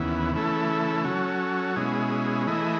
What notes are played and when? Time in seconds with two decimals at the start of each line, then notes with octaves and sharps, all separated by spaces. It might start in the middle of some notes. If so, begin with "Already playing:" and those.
Already playing: D#2 C#3 E3 B3 E4
0.33 C#3 E3 A3 E4 A4
1.04 F#3 C#4 F#4 A4
1.76 B2 G#3 C#4 E4 G#4
2.47 E3 A3 E4 G#4 D#5